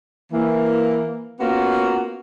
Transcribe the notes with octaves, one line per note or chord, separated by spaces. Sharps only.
E3 A#3
A#3 B3 C#4 F4 F#4 A#4